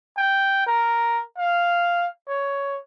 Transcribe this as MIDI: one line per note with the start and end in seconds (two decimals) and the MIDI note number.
0.17 0.65 79
0.67 1.21 70
1.38 2.07 77
2.28 2.79 73